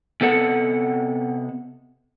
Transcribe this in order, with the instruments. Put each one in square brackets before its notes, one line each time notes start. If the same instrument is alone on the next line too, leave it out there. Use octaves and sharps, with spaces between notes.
[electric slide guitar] C3 B3 A4 F#5